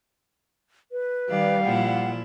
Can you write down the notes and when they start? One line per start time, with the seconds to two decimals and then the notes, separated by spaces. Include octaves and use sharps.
0.92 B4
1.29 D#3 G3 D5 F5
1.64 A#2 F3 E4 F#5